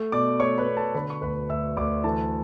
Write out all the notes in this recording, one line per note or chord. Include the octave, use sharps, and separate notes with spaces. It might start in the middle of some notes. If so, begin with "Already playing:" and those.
Already playing: A3
B2 D5 D6
A3 C#5 C#6
B4 B5
B2
A4 A5
D3 B4 B5
C#6
D2 B4 B5
D2 E5 E6
D2 D5 D6
E3 A4 A5